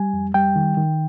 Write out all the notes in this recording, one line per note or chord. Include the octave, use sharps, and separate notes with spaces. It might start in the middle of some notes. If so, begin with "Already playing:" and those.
Already playing: G3 G#5
F2
G3 G5
D#3
D#3